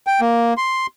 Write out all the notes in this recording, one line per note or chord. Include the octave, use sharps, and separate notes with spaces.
G5
A#3
C6